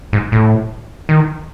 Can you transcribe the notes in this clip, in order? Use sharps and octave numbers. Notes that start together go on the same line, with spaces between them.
G#2
A2
D#3